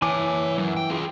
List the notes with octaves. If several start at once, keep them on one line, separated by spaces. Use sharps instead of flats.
E3 C#5 G#5 A5 D6
F#2
G5
F4 G#4